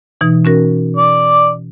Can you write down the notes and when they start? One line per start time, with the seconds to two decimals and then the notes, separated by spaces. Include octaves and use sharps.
0.21 B2 E3 D#4
0.45 C#4 F#4 A#4
0.97 D5